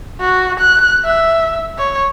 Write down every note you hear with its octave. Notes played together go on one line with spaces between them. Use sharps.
F#4
F#6
E5
C#5